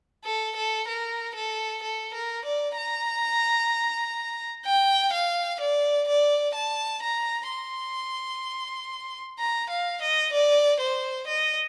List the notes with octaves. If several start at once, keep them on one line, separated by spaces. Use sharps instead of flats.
A4
A4
A#4
A4
A4
A#4
D5
A#5
G5
F5
D5
D5
A5
A#5
C6
A#5
F5
D#5
D5
C5
D#5